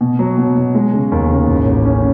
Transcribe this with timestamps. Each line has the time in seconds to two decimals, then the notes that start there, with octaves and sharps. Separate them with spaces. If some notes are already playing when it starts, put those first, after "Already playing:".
0.01 B2
0.19 F#3
0.38 B2
0.57 B2
0.75 G#3
0.93 C#3
1.12 D#2
1.30 C#3
1.48 A1
1.66 A1
1.85 C#4